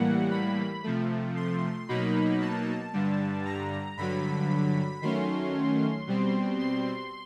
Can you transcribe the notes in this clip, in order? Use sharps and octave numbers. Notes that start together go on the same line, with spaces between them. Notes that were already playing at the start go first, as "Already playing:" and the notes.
Already playing: A2 E3 G3 A#3 F#5
B5
C3 F3 A3
C6
B2 F#3 A#3 D#4 B5
A5
G2 D3 G3
A#5
G2 D3 F#3 B5
D#3 F#3 A3 C#4 C6
B2 G3 C4
C6